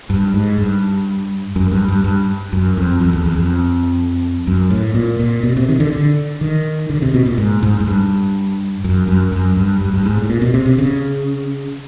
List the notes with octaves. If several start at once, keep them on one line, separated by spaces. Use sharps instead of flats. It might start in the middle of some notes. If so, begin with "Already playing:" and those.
G2
G#2
G2
F#2
G2
G2
G2
F#2
F2
F2
E2
E2
F2
F#2
A2
A#2
A#2
B2
C3
D#3
D3
D3
D#3
D3
C3
B2
A#2
G#2
G#2
G#2
G2
F#2
F#2
F#2
G2
G2
G2
G#2
A2
A#2
B2
C3
C3
C#3